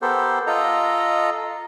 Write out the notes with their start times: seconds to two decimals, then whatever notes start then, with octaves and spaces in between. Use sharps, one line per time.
0.02 B3 G4 A4 A#4 C5
0.47 F4 A4 D#5 A#5